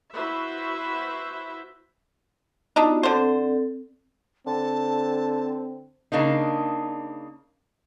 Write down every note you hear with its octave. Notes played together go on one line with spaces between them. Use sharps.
E4 F#4 B4 C5 E5
B3 D4 D#4 F4 F#4
D3 C4 A4 C5
D3 C4 A5
C#3 A#3 D4 D#4